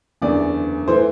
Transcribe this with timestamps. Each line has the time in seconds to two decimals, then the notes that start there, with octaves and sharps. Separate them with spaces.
0.22 F#1 E2 D3 D5
0.88 E3 A3 C5